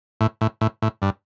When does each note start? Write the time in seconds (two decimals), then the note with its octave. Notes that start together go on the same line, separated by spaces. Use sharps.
0.21 A2
0.41 A2
0.61 A2
0.82 A2
1.02 G2